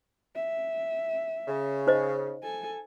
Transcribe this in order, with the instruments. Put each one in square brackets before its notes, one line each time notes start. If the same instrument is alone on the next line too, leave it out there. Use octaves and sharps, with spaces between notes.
[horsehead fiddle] E5
[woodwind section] C#3
[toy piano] D#4 C5 D#5
[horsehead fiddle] A4 G#5